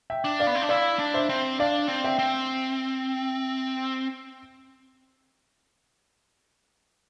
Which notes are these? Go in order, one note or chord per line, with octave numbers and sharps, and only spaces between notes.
E5 G5
D4
D5 F5
B3
C4
D4
E4 D5 F5
D4
C5 E5
C4
D4 D5 F5
C4
E5 G5
C4